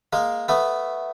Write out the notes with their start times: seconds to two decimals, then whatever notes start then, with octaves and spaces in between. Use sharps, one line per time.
0.13 G#3 A#3
0.49 A3 B3